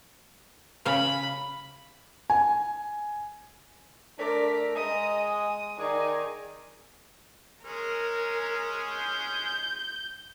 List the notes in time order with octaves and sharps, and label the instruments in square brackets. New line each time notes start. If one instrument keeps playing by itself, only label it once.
[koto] C#3 F5 [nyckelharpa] B5
[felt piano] G#5
[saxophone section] A3 A#4 [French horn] D4 [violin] D5 B6
[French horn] G#3 [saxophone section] D#5 [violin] A#5 D#6
[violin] D#6
[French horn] D#3 [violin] D#4 G#5 [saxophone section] G#4 D5
[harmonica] G#3 C#4 G#4 [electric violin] A#4
[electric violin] G6